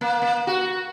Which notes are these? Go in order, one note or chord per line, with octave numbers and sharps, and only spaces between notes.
A#3
A#3
F#4